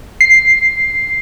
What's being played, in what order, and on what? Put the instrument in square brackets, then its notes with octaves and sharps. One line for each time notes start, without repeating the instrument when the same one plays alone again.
[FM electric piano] C7